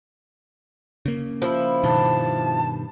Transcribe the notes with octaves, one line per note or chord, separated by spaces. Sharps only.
C#3 A#3
F3 E4
G2 B2 D#3 A5